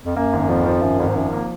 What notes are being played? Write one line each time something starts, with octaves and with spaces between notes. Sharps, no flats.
F2
F#2 A#3
G#1 F#2
F2 F3
F3
G#1 F#2
G#1 F2
G#2
F#2 F3
A#3